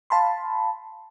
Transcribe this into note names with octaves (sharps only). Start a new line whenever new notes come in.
F5 A5 B5 C6